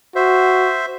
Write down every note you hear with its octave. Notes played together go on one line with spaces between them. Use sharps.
F#4 C5 E5